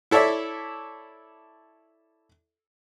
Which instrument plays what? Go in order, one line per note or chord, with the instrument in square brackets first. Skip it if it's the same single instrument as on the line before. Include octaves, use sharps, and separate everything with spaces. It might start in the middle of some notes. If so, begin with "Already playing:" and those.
[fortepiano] E4 A4 C#5 D5 E5